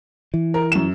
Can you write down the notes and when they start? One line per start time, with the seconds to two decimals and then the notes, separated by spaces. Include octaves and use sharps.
0.34 E3
0.54 A#4
0.72 F#2 E7